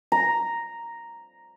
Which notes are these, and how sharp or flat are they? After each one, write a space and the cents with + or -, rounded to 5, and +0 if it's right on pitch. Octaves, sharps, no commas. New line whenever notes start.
A#5 +0